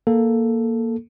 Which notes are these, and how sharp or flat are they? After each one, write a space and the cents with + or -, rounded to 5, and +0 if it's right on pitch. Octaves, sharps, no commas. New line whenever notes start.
A#3 +0 A4 +0